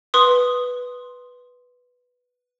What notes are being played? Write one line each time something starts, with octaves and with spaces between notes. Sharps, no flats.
B4 C6 D#6